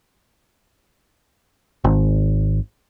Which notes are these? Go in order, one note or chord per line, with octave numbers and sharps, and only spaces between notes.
G#1